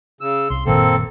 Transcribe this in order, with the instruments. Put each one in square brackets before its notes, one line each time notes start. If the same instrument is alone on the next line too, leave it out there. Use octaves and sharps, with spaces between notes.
[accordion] C#3 E6
[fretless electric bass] C2 [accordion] C6
[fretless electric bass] F#1 A#2 D#3 [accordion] A#3 C4 A4